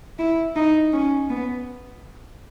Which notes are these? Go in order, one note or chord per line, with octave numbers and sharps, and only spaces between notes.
E4
D#4
C#4
B3